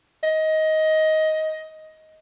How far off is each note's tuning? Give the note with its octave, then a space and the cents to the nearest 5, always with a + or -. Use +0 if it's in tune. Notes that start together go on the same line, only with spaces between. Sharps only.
D#5 +15